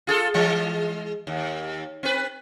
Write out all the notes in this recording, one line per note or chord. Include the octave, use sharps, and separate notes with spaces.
F4 G#4 A4
E3 G#3
D#2
C4 B4